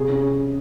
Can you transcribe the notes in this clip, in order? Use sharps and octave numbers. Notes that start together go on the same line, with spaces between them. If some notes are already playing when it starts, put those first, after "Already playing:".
Already playing: C3 G#4
C#4